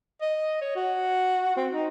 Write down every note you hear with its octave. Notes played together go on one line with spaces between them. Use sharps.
D#5
C#5
F#4
C4
D#4